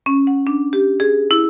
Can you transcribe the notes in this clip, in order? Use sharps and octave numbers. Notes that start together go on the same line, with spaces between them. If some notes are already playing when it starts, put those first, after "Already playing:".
C#4
F#5
D4
G4
G#4
E4